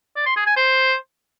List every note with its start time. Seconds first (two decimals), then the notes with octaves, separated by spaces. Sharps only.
0.16 D5
0.26 C6
0.36 G#4
0.46 G#5
0.57 C5